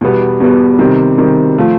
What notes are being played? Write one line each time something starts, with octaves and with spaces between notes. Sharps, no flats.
E2 B2 G3 B3
E2 B2 G3 B3
C3 D#3 G3
C3 D#3 G3
F3 A3